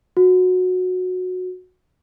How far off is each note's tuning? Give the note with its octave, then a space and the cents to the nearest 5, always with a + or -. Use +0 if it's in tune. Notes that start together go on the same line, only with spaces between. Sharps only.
F#4 -15